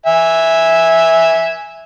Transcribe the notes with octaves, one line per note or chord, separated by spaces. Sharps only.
E5 G#5